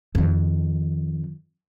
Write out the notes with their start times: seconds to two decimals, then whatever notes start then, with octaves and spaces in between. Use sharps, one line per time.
0.15 F2 D#3